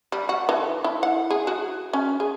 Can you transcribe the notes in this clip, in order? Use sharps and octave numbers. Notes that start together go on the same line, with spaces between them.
G3
F#4
E3
E4
F#5
G#4
F#4
C#4
G#4